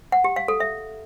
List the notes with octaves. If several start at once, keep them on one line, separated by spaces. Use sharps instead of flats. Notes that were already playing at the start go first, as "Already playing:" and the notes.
F#5
G4
F5
A4
E5